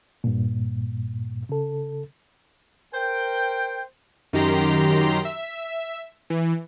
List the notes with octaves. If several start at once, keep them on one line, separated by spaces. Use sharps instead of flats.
G2 A#2
C#3 A4
A#4 C5 G5
F#2 D#3 G4 A#5 C6
E5
E3